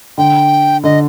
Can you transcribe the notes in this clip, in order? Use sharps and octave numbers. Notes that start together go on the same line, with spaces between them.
D3 G5
D3 D#5